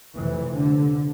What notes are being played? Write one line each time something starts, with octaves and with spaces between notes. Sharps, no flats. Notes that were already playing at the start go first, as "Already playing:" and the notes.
F1 F2 C3 E3
D3